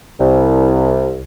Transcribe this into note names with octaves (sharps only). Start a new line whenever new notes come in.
C2